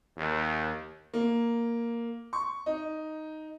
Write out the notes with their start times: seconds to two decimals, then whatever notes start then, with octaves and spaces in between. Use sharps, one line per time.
0.17 D#2
1.14 A#3
2.33 C#6
2.66 D#4